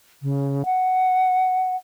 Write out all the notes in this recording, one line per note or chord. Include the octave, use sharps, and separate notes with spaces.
C#3
F#5